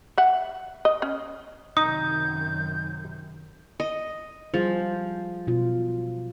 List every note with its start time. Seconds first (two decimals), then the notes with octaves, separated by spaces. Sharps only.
0.17 E5 F#5
0.85 D#5
1.02 C#4
1.77 F#2 C3 D#3 D#4 D#6 G6
3.80 D#5
4.54 F3 G3 G#4 C5
5.47 B2 F4